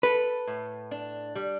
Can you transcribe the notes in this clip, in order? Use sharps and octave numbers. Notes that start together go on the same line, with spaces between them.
A4 B4
A2
D4
G3